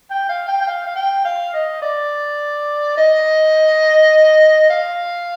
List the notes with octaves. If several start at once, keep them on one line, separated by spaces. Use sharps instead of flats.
G5
F5
G5
G5
F5
F5
G5
F5
D#5
D5
D#5
F5